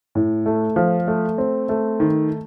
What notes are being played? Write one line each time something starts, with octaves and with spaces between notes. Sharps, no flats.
A2
A3
F3
A3
C4
A3
D#3